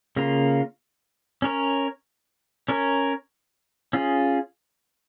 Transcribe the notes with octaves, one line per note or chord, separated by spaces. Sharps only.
C#3 A#3 F4
C#4 A#4 C#5
C#4 A#4 C#5
C#4 F4 G#4